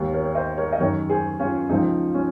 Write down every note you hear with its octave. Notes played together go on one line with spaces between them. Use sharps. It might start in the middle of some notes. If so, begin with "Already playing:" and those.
Already playing: D#2 D#3
A#4 C#5
C#5
C5 D#5
A#4 C#5
D#5
F#2 D#3 A#4 C#5
G#4 C5
C#4 F4
C#2 C#3 F3 D#4
C#4